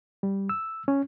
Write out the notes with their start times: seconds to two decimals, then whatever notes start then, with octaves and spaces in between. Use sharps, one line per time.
0.23 G3
0.49 E6
0.88 C#4